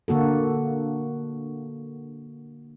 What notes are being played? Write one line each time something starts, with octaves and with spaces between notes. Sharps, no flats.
D3 A#3 F#4 A4